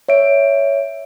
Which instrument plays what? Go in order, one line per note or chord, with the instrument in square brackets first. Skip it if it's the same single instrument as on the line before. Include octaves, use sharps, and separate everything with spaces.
[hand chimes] C#5 E5 D7